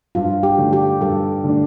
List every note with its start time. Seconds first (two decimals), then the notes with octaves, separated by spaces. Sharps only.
0.15 G2 F4
0.43 G4
0.58 D3 A3 D4
0.73 G4
1.01 G2 A4
1.44 D3 A3 D4